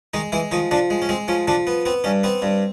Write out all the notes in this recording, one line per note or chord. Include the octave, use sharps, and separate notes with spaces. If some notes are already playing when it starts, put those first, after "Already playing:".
D#3 G#3 D#4
E3 G#3 E4
D#3 F3 D#4
D3 F3 D4
G#3
C#4
G#3 C4
F3 C#4
D3 F3 D4
B3
B3 C4
G2 C#4
B3 C4
G2